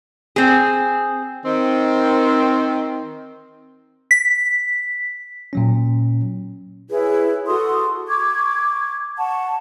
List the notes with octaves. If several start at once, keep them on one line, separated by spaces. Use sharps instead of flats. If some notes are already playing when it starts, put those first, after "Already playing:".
C4 G#4
D#3 C4
B6
A#2 F#3 C#4
E4 G#4 B4 C#5
F#4 A4 C6 D#6
C#6 D6 G#6
F#5 A5 C#6